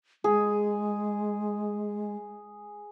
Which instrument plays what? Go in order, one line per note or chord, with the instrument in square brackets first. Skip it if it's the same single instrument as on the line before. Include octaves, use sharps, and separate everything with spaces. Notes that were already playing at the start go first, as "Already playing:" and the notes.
[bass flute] G#3 [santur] G#4